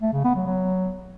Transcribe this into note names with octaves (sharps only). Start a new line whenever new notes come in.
A3
C#3
B3
F#3
F#3